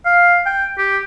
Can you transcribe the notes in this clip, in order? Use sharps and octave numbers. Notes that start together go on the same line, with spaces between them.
F5
G5
G4